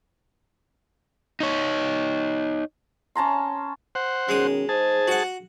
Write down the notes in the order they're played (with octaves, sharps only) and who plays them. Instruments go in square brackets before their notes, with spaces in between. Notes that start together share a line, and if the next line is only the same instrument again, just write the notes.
[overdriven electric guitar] D#4 C#5
[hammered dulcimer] C#4 A5 A#5 C6
[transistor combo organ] C5 F#5
[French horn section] B2 D#3 C#4 [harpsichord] G#3 D#6
[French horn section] D#4 C5 [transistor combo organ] G#4 A5
[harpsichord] F#4 F#5